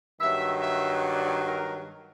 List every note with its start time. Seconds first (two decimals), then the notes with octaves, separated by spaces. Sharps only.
0.21 G2 D#3 F#3 E5
0.62 E5
1.05 D5
1.47 A#4